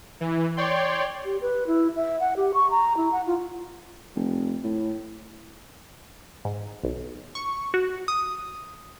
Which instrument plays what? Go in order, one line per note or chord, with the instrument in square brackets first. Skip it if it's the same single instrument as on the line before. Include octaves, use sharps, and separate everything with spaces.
[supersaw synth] E3
C#5 D5 G5 C6
[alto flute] G4
B4
E4
E5
F#5
G4
C#6
A#5
E4
F#5
F4
[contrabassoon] F1
A2
[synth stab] G#2
B1
C#6
F#4
D#6